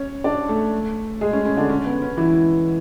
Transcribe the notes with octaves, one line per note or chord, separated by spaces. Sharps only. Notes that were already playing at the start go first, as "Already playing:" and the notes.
Already playing: C#4 C#5
D4 D5
A3 A4
G#3 G#4
C#4
C#4
D3 D4
C#4
B3
C#4
E3 E4